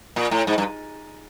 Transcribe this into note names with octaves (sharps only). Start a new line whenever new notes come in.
A#2
A2
G#2
G2